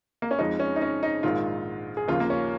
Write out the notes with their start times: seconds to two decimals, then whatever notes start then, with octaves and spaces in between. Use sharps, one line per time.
0.22 A#3
0.31 C#4
0.38 F2 F3 G#3 D#4
0.60 C#4
0.76 D#4
0.82 C#4
1.03 D#4
1.23 A#1 G#2 D#3 G#3 F4
1.97 G#4
2.08 D#2 C#3 F3 A#3 F4
2.20 A#3
2.30 C#4